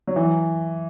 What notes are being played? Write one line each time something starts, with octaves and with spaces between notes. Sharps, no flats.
F#3
E3